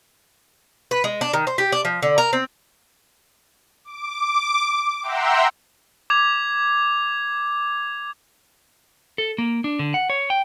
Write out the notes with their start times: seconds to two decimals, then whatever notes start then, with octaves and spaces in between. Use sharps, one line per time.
0.91 B4
1.04 G#3
1.21 D4
1.33 D#3
1.47 C5
1.58 G4
1.72 D4
1.85 F3
2.03 D3
2.18 A#4
2.33 C4
3.84 D6
5.02 E5 F#5 G5 A#5 C6 E6
6.10 D6 G#6 F7
9.18 A4
9.38 A#3
9.64 D4
9.79 D3
9.94 F#5
10.10 C#5
10.30 G5